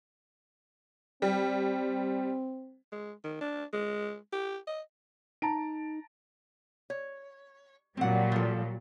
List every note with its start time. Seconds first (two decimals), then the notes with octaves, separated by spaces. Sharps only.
1.22 G3 C4
2.92 G#3
3.24 D#3
3.41 D4
3.73 G#3
4.33 G4
4.67 D#5
5.42 D#4 A5 A#5 D7
6.90 C#5
7.97 A#2 F#3 G3 C4 F#5
8.32 F3 A4